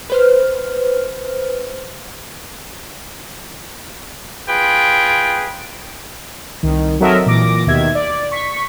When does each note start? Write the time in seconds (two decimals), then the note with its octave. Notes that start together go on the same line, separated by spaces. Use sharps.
0.10 B4 C5 F6
4.48 F4 G#4 B4 G5
6.63 C2 D#3
7.00 F#3 C4 A4 A#4 D#5 E5
7.26 A#2 E3 D6 A#6
7.66 D#2 B2 D#3 E5 G#6
7.95 D5
8.31 C#6 B6